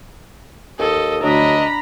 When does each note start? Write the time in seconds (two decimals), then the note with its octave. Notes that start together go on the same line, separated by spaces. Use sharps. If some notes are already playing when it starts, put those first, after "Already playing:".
0.79 D#2 A4 D#5
1.23 D2 F#3 D4 D#5 A#5 B5